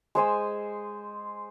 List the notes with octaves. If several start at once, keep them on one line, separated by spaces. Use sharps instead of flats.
G#3 C5 G#5 E6